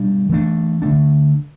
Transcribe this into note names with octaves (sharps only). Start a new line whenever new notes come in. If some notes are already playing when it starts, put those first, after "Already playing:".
Already playing: B2 G3 D4
E3 A3 D4
D3 A3 D4